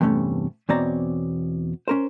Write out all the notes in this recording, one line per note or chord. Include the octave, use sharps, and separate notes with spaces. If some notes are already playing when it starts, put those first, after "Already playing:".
E2 G2 C3 A3 C#4
E2 B2 C4 C#5 D5 A#5
C#4 A#4 C5